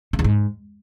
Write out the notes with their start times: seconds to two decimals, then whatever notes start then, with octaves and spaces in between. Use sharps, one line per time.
0.13 C#3
0.19 E2
0.24 G#2